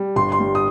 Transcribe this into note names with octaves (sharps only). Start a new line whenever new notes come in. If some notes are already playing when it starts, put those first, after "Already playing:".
Already playing: G3
G1 C6
C6
G3
D#6